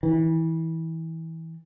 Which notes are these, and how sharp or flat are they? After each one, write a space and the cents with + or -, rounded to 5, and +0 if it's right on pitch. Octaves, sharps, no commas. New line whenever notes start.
E3 -25